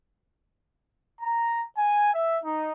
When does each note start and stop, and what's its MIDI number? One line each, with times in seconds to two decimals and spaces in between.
1.21 1.64 82
1.76 2.12 80
2.14 2.39 76
2.43 2.72 63